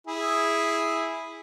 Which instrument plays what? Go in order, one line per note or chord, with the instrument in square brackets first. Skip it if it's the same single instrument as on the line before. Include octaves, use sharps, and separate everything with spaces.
[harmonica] E4 G#4